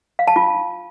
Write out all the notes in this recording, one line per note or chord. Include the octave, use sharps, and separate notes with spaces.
F5
A5
F4